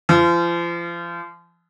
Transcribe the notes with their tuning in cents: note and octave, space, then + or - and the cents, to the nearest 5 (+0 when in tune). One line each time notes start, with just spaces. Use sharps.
F3 -35